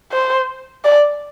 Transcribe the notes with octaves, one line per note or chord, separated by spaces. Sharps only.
C5
D5